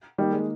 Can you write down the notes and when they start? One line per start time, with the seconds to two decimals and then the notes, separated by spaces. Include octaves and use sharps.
0.18 D#3 G3 A#3 D#4 G4
0.32 G#3